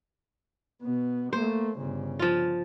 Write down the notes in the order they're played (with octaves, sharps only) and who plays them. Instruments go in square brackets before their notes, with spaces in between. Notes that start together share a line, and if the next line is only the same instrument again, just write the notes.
[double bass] B2 B3
[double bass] A3 A#3 [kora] C5
[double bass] G1 C#3
[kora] F3 F4